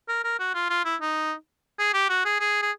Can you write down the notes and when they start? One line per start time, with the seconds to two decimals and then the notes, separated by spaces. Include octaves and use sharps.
0.08 A#4
0.24 A#4
0.39 F#4
0.54 F4
0.70 F4
0.85 E4
1.01 D#4
1.79 G#4
1.94 G4
2.09 F#4
2.25 G#4
2.40 G#4
2.62 G#4